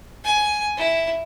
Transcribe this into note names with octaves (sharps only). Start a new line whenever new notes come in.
G#5
E4